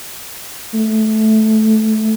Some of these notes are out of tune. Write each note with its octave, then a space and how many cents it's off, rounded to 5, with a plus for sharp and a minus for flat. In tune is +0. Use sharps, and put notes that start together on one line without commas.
A3 -15